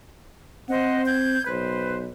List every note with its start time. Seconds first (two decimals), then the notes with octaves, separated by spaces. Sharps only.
0.69 C4 C5 D#5 F#5
1.06 G6 G#6
1.47 B1 B4 C5